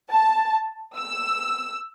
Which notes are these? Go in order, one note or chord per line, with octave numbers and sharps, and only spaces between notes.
A5
E6